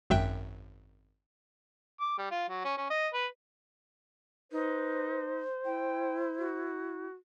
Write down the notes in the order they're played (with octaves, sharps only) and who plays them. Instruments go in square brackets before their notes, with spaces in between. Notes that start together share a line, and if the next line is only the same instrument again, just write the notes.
[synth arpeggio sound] G#1 F#2 E5 G5 F#6
[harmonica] D6
G3
F4
F#3
C#4
C#4
D#5
B4
[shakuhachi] D#4 [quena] B4 [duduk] C5
[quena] E4 [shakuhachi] G5
[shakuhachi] F#4